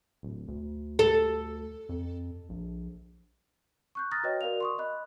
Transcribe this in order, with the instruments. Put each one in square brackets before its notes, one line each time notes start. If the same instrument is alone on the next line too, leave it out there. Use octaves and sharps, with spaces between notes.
[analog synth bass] D1
D2
[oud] A4
[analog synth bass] F2
A#1
[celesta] C#6 F#6 G6
A#5 D#6 F6 F#6 A6 A#6
F#4 B4 C#5 D#5 G5
F#4 A#4 D5 F5 F7
C6 C#6 D#6
D#5 B5 F#6